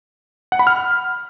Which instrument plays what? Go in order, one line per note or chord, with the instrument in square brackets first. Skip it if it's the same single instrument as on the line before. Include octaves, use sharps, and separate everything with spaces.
[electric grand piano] F#5
B5
F6